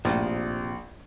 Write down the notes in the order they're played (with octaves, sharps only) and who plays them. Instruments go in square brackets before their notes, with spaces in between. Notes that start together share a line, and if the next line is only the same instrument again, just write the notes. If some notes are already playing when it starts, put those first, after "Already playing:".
[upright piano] A#1 [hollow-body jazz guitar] A2 C3 F3